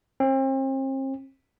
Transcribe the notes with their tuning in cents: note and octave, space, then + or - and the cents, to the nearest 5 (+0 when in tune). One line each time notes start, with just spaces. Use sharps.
C4 +40